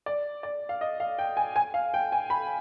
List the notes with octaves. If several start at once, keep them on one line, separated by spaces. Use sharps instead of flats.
D5
D5
F5
D#5
F5
G5
G#5
G#5
F5
G5
G#5
B5